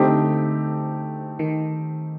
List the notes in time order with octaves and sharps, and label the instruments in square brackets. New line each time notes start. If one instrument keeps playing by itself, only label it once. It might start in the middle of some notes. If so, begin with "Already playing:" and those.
Already playing: [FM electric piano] D3 [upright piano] A3 C4 D#4 G4
[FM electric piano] D#3